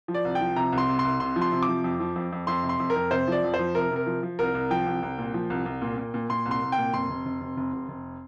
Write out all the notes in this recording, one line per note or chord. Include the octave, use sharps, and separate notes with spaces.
F3
D5
C2
G5
F3
C3 A#5
C2
C6
C3
C6
C2
C3 C6
F3
C6
C3
D6
F3
F2
F3
F2
F2
F2 C6
C3
C6
F2
A#4
F2
C3 C5
F3 D5
F2
C5
F3
C3 A#4
C3 A#4
F3
F3
C2 A#4
C2
F3 G5
C2
C2
A#2
F3
C2
C2
A#2
A#2
A#2
A#2 C6
C2
C6
C2
G5
A#2
F1 C6
F1
F1
F1
F1
F1
F1